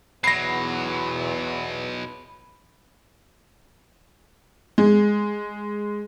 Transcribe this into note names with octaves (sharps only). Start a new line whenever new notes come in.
E2 B2 F#3 B3 B5 A#6 C7
G#3